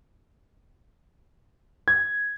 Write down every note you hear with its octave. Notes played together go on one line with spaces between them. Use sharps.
G#6